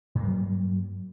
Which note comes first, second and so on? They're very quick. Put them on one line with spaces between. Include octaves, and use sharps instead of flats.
G2 A#3 G3 F#3